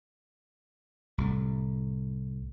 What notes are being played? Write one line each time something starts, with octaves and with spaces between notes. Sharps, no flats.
C2 A2